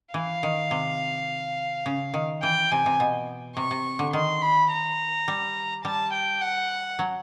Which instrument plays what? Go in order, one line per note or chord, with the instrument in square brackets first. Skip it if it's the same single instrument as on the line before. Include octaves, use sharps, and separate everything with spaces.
[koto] E3 [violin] F5
[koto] D#3
C3
C#3
D#3
[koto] E3 [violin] G5
[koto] C3 [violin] G#5
[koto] C3
B2
[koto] C3 [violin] C#6
[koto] C3
D3
[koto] D#3 [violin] C6
[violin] B5
A#5
[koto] G3
[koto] G3 [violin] A5
[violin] G5
F#5
[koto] F#3